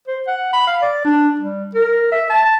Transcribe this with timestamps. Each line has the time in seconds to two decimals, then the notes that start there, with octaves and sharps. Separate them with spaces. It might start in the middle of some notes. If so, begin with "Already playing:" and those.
0.08 C5
0.28 F#5
0.53 B5
0.67 F5
0.82 D5
1.05 D4
1.40 G3
1.75 A#4
2.12 E5
2.30 A5